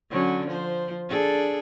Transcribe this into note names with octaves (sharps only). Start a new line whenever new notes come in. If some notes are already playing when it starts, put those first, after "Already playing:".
D3 F#3 C#4
F3 C5
D4 G#4 A4